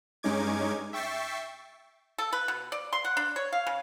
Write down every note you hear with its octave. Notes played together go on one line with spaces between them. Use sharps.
G2 G#3 C#4 D#4 D6 G#6
E5 G5 C#6 A6 B6 C7
A4
B4
B2
D5
C6
F#5
D4
C#5
F5
C#3